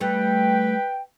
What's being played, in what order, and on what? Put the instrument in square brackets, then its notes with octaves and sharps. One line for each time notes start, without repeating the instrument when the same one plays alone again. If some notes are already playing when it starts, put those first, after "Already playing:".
[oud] G3 A3 [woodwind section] B4 G5